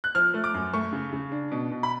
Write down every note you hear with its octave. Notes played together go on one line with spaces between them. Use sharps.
F#6
F3 F6
A3
D6
F#2
A3 C#6
C#3
C#3
D4
B2
B2
B5